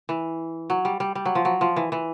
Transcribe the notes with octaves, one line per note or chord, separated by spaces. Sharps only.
E3
F#3
G3
G3
G3
F#3
F3
F#3
F3
E3
E3